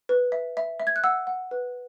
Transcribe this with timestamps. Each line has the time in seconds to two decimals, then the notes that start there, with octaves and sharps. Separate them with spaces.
0.09 B4
0.32 E5
0.57 E5
0.80 E5
0.87 G#6
0.96 F#6
1.04 F#5 E6
1.27 F#5
1.51 B4